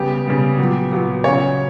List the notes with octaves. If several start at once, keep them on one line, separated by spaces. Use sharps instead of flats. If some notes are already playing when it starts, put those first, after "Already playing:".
Already playing: C#3 G3 B3 G4
C#3 G3 B3
A#2 F#3 B3
A#2 F#3 B3
C#3 F#3 C#4 C#5